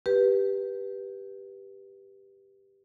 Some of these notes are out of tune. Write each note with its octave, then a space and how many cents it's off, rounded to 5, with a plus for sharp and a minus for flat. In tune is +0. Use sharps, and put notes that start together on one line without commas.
G4 +0 B4 -15